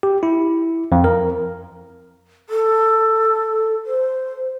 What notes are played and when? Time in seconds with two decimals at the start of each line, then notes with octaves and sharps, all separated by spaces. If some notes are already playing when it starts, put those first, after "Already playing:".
0.03 G4
0.23 E4
0.92 F2
1.04 A#4
2.49 A4
3.86 C5